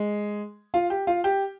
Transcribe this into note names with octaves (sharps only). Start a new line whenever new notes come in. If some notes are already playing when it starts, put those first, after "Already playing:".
Already playing: G#3
F4
G4
F4
G4